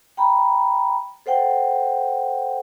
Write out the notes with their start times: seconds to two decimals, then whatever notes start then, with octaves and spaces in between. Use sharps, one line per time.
0.17 G5 A#5 B5
1.26 A4 C5 F#5 G5